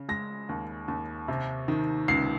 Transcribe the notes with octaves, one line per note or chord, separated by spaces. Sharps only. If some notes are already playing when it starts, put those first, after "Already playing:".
Already playing: C#3
G#3 A#6
D#2
D#2
C3
D#3
C#2 C7